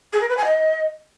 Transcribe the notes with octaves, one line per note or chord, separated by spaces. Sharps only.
G#4
A#4
B4
G#5
D#5